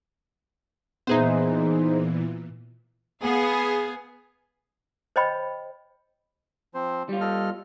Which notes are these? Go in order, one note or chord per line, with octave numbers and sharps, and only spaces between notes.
A#2 E3 B3 D#4 G#4 C5 E5
B3 G#4 F5
C5 C#5 D#5 G5 B5
F3 C4 C5
G3 F4
A4 D#5 F6